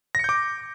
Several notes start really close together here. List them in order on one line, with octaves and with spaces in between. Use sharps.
A#6 C#7 G6 D6